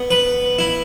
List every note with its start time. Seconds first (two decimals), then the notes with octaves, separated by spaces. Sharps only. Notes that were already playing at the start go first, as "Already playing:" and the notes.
Already playing: B3
0.11 B4
0.59 E4